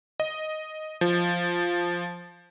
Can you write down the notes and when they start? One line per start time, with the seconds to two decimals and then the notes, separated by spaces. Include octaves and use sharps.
0.20 D#5
1.01 F3